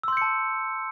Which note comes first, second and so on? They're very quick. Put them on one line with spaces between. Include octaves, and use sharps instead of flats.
E6 C6 G6 C#7 A5